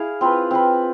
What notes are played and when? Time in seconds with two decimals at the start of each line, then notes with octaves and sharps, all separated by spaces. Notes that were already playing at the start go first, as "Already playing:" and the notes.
Already playing: E4 G#4 F5
0.21 C4 F4 B4
0.51 C4 F4 B4